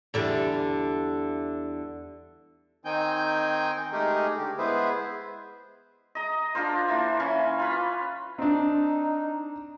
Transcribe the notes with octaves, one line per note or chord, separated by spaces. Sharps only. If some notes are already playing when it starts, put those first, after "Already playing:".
E2 D3 G3
D#3 C4 D#4 G5 G#5 G6
G#3 A3 D#4 G4 G#4 A#4
D3 G4
G#3 B3 E4 G#4 B4 C5
D#5 A#5
D4 F4 A#4 C5
E3 A#3
E3 C#4
F4 B4
C4 D4 D#4